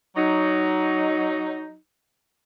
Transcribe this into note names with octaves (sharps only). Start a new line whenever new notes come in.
F#3 D#4